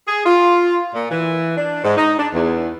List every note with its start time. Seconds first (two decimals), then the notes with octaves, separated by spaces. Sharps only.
0.08 G#4
0.26 F4
0.95 A#2
1.11 E3
1.57 D4
1.84 G#2
1.97 D#4
2.18 D4
2.34 E2